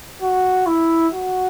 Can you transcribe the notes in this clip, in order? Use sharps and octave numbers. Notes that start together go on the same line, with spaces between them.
F#4
E4
F#4